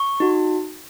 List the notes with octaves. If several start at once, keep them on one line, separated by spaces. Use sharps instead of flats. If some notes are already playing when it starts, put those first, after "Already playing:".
Already playing: C#6
D#4 F#4